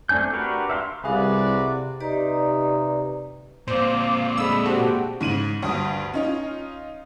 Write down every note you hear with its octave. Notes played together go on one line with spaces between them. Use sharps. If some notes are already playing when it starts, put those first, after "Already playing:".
A3 C4 D4 G#5 G6
D4 F#4 G4 A#4 B4
E5 F5 B5 C6
C2 C3 F#4 G#4 B4 D5 F5
C3 D#4 G4 B4 D5
A#2 C4 C5 F5 D6
G#3 A3 D4 B5 D#6 E6
F#4 G4 A4 C5
G#2 C#3 D#7 F#7
D2 G2 D#6
C#4 D#4 F4